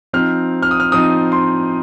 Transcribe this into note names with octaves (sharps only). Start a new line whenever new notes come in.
F3 C4 D#4 F6
F6
D#6
F6
F3 C4 D#4 D#6
C6